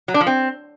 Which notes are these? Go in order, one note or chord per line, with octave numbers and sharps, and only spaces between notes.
F#3
D4
F3
C4